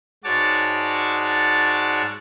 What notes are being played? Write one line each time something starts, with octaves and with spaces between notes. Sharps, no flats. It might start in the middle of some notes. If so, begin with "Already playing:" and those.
G#2 F#4 C#5 D5 A5